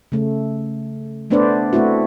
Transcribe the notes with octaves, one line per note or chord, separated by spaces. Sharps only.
C#3 A3
A3 B3 D4 B4 C5 D5
A3 C4 E4 F#4